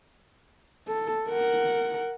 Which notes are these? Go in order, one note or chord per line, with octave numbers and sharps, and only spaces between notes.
A4
A#4 F#5